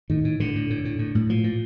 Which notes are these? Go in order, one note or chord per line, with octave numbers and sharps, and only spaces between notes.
A2 D#3
A2
A2 D3
A2
A2
A2
A2
A2
A#2 F3
A#2